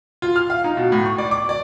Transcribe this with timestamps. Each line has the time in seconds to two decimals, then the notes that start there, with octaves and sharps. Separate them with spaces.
0.22 F4
0.36 F6
0.50 F5
0.64 D#4
0.77 B2
0.92 A2
1.05 C#6
1.18 D5
1.31 D6
1.49 D5